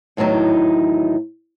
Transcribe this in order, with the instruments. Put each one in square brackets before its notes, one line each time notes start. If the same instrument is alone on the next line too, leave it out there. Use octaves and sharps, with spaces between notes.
[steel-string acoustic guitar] E2 A2 D#3 F#3 D#4